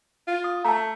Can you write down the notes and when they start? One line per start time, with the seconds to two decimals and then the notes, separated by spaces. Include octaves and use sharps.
0.27 F4
0.44 D#6
0.65 A3 A5 A#5